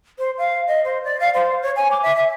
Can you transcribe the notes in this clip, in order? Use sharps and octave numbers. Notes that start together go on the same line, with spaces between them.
C5
F5
D#5
C5
D5
F5
C5
C#5
G#5
D6
E5
E5